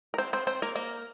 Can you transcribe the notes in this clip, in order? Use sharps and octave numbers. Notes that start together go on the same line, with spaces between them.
A#4
C4 C5
C4 C5
C4 C5
A#3 A#4
A#3 A#4